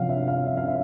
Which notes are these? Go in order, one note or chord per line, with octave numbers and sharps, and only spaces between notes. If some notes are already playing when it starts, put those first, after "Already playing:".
Already playing: C3 F3 F5 F#5
E5
F5
E5
F5
E5